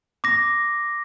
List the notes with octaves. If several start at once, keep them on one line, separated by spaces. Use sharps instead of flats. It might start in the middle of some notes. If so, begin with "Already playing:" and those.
D6 A#6